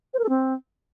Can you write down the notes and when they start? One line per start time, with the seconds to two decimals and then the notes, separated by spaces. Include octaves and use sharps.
0.14 C5
0.19 A#4
0.24 A4
0.29 C4